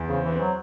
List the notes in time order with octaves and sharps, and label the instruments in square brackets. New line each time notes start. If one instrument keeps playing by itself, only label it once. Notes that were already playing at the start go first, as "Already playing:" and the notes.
Already playing: [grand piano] E2
[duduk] C#3 [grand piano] C4
[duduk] E3
[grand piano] C4
[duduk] F#3